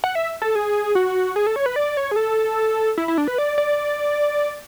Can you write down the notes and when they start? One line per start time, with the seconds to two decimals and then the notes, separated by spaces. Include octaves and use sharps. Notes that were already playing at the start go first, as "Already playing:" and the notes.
0.04 F#5
0.15 E5
0.42 A4
0.55 G#4
0.95 F#4
1.36 G#4
1.47 A4
1.56 C#5
1.66 B4
1.76 D5
1.97 C#5
2.11 G#4
2.16 A4
2.98 E4
3.08 E4
3.18 D4
3.28 B4
3.38 D5
3.58 D5